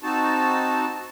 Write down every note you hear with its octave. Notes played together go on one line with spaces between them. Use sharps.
C4 D#4 F#4 A5